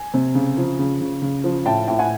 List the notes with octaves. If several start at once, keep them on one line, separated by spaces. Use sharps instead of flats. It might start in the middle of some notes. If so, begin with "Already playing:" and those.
Already playing: G#5
C3
C#3
F3
C#3
C#3
C#3
F3
A2 G5 A5
A2 G5
F#5 G#5